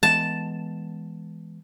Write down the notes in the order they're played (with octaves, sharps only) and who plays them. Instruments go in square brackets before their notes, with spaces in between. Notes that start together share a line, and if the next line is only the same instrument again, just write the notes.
[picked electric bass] E3 G#3 B3 [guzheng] A5